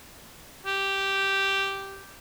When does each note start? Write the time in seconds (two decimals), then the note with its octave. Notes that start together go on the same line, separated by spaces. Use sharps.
0.66 G4